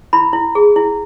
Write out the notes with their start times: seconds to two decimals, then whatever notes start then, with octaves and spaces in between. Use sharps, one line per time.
0.13 E4 B5
0.33 E4
0.55 G#4
0.76 E4